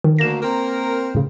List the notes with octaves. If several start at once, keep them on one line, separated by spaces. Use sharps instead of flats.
D#3
D2 A#3 A#6 E7
A#3 C4 A#4
A2 C#3